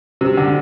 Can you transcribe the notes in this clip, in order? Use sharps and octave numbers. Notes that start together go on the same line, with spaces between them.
C3
D3